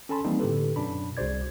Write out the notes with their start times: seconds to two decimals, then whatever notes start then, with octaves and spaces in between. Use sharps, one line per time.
0.09 C#4 A4 G#5 A5 B5 C6
0.24 E3 F3 G3 A#3 C4 D#4
0.40 A2 D3 G4 A4 B4
0.76 F#2 B2 D4 B5
1.17 C2 F#4 G#4 C5 D5 G#6